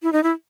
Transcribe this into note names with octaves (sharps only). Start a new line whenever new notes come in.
E4
D#4
E4